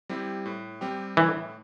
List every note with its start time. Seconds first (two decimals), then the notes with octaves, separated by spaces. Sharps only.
0.09 G3 C4 E4 G4
0.46 A2
0.81 G3 C4 G4
1.17 A2 E3